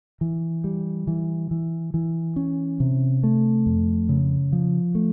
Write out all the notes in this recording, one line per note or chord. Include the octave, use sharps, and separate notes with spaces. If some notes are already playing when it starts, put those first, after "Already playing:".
E3
G3
E3
E3
E3
C#4
C3
A3
F2
C#3
F3
A3